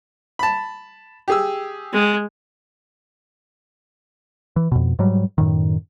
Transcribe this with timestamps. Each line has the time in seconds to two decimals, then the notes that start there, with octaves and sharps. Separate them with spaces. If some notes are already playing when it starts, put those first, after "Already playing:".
0.39 A5 B5
1.28 G4 G#4 E6
1.93 G#3
4.56 E3
4.72 F2 B2
4.99 G#2 F#3 G3
5.38 F#2 A2 D#3